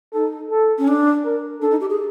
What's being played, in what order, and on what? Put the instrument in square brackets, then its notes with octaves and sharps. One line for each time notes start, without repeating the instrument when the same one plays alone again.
[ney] D#4 [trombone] A4
[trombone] A4
[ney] C#4
D4
[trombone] A#4
[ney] D4 [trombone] A4
[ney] D#4
G4
G#4